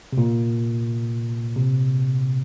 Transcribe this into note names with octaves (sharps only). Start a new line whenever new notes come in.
C3
A#2
C3